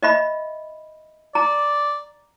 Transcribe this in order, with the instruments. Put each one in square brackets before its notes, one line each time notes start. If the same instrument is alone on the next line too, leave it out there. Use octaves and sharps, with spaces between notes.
[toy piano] D#5 E5 B5
[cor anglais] D5 [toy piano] A#5